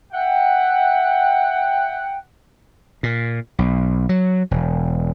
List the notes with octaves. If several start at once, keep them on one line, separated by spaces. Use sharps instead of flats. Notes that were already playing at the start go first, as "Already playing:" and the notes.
E5 F#5 G5
A#2
B1
F#3
E1